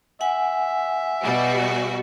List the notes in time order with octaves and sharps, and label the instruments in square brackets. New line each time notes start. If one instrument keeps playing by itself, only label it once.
[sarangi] E5 [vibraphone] F#5 G#5
[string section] B2 G3 F#4